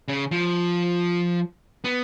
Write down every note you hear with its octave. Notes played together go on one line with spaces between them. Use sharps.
C#3
F3
B3